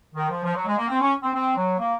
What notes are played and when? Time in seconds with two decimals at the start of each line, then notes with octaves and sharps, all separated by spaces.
0.15 D#3
0.30 F3
0.44 F3
0.55 F#3
0.66 G#3
0.78 A#3
0.89 C4
1.01 C#4
1.23 C4
1.34 C4
1.57 F#3
1.79 A#3